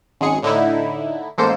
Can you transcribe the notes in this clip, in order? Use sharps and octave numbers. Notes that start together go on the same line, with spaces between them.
G#1 F#2 G#3 G#4 C#7
A2 D3 D#4 E4
A1 G#2 A#3 A4 C5 G6